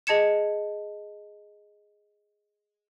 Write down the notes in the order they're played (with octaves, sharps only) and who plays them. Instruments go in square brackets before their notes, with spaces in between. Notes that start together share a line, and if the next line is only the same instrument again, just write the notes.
[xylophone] G#4 D#5 A5 G#6 C#7 E7